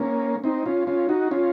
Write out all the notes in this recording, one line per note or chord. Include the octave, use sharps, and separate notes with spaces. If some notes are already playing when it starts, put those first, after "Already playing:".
Already playing: A#3 C#4
C4 D#4
C#4 F4
C#4 F4
D#4 F#4
C#4 F4